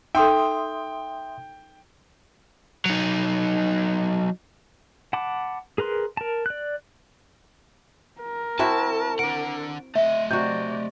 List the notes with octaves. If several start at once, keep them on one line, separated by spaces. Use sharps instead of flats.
D#4 A4 E5 G5 C6 D#6
F#3 D#4
F#5 A5 B5 D6
G#4 A#4 B4 C6
A#4 A5
D5 F#6
A#4
C4 E4 F#4 A5
D4 F#5 D7
A3 D#5 E5
C3 F#4 D5 G6